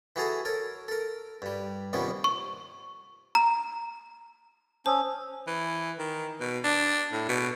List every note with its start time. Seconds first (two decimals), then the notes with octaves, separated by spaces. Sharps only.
0.16 E3 F#4 G#4 A4 A#5
0.45 A4 A#4 C#5
0.88 A4 A#4
1.42 G2 G3
1.93 A#1 D#2 C3 G3 B3 C#4
2.24 C#6
3.35 A#5
4.86 C#4 C5 A5 D#6 E6
5.48 E3
5.99 D#3
6.41 B2
6.64 D4
7.13 A2
7.29 B2